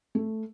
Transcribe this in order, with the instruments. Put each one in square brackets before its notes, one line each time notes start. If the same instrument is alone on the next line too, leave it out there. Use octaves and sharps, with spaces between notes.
[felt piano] A3